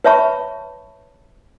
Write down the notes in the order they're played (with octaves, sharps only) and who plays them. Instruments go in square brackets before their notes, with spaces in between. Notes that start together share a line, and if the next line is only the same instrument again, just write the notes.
[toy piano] B4 C#5 E5 A5 B5 C#6